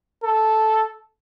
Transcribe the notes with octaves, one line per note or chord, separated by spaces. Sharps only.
A4